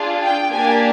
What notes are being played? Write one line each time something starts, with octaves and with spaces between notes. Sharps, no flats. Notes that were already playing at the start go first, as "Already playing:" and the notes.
Already playing: D4 F4 G#4
G5
A#3 D4 G4 G#5